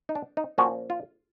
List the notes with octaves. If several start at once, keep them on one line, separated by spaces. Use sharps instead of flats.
D#4
D4
D#4
A#2 F3 A#3 C#4 F#4
F4